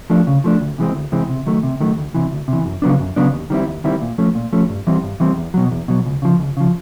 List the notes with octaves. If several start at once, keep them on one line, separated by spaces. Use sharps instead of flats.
F3 A3 D4
C#3
F3 A3 D4
D2
C3 E3 G#3 C4
D2
C3 E3 G#3 C4
C3
D#3 F#3 A3
C3
D#3 F#3 A3
D2
C3 E3
D2
C3 E3
F#2
C#3 F#3 B3 D4
F#2
C#3 F#3 B3 D4
D#2
D#3 G3 C4 E4
D#2
D#3 G3 C4 E4
A#2
F3 A3 C#4
A#2
F3 A3 C#4
G2
E3 G3 C4
G2
E3 G3 C4
E2
B2 F#3
E2
B2 F#3
C#2
C#3 F3
C#2
C#3 F3